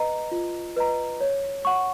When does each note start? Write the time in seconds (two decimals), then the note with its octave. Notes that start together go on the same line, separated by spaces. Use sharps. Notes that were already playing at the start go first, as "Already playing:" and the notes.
Already playing: B4 D#5 A#5
0.31 F4
0.76 B4 D#5 A#5
1.21 C#5
1.65 F#5 C#6